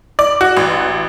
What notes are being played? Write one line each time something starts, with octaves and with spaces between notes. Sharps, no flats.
D5
F#4
A1